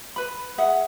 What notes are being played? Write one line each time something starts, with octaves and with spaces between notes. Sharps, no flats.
B4 B5
G#4 E5 F#5